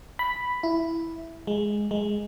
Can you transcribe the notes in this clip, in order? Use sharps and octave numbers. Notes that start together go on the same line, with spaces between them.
B5
E4
G#3
G#3